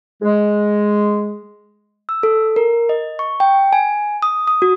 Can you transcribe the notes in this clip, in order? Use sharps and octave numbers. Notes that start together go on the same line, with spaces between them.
G#3
E6
A4
A#4
D#5
C#6
G5
G#5
D#6
D#6
F#4